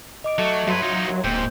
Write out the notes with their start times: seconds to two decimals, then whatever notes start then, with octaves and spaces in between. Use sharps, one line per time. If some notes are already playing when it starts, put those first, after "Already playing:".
0.24 D#5 D6 D7
0.38 F#3 A3
0.67 G2 F#3 B4 E5 C6 G#6
0.82 D#4 F4
1.07 D#2
1.24 D1 G#2 A#3 C4 C5 G6